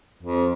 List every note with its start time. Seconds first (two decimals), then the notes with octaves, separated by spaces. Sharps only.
0.23 F2